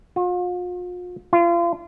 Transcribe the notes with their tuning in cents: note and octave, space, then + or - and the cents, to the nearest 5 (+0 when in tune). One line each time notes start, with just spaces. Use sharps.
F4 +40
F4 -35